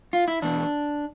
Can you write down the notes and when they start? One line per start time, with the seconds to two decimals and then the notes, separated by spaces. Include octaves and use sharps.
0.13 F4
0.28 E4
0.42 E2 B2 D4